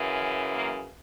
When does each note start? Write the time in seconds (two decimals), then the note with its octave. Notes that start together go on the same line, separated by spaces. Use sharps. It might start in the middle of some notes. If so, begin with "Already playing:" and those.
Already playing: F#2 C#3 E3
0.53 A#3